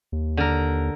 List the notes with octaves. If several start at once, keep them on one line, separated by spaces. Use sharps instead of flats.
D#2
D3 A#4